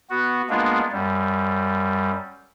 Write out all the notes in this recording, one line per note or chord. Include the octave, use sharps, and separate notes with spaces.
B3 F#4
G#3 A#3 B3 D4 F4
F#2 G3